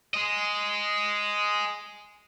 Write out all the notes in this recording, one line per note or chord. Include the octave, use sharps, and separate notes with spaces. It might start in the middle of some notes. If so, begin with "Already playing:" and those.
G#4 D#5